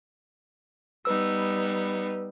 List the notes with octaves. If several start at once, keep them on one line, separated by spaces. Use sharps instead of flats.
G3 B3 D#4 B4 E6